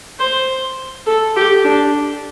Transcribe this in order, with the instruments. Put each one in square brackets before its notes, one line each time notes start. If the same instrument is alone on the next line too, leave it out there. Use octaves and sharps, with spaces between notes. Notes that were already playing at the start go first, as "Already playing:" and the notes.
[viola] C5
A4
G4
D4